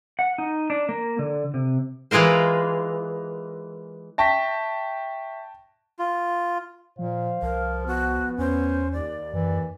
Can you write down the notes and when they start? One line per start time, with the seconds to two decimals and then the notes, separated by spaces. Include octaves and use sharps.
0.19 F#5
0.38 D#4
0.70 D4
0.89 A#3
1.19 D3
1.54 C3
2.11 E3 G#3 F4 A#4 C5
4.18 E5 G5 A5 C#6 A#6 B6
5.99 F4
6.99 A#2 F3 C5 F5
7.42 C2 F3 A#4
7.87 B3 F#4
8.38 E2 C#4 C5
8.93 D#2 D5
9.33 F#2 E3